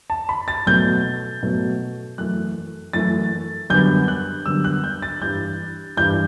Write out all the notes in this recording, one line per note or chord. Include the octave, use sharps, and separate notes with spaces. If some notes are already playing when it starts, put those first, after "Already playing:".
A5
B5
A6
B2 F#3 A3 G6
B2 F#3 A3
F#2 E3 A3 F#6
F#2 E3 A3 A6
F#2 D3 G3 B3 G6
F#6
F#2 D3 G3 B3 E6
F#6
G6
A6
G2 E3 G3 G6
G2 E3 G3 G6